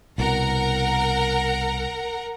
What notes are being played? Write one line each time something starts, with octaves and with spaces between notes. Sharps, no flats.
C2 B2 A#4 F#5 A#5